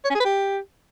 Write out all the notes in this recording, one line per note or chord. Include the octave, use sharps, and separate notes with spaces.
C#5
C#4
G#4
B4
G4